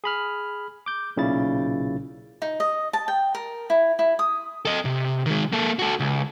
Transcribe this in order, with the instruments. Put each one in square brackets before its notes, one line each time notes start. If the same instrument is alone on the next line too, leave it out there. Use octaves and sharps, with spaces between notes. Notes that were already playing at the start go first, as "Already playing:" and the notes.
[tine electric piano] G#4 B5 F6
D6 G6
B1 A#2 C#3 C#4 E4 A6
[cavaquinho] D#4
D#5
A5
G5
A#4
E4
E4
D#6
[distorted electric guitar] A4 D#5
C3
D#3 G#3
A#3 A4
F#4 A4
C#2